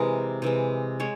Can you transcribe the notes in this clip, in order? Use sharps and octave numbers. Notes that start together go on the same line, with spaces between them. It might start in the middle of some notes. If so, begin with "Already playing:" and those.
Already playing: C3 E3 G#3 A#4
C3 E3 G#3
G#3 C#5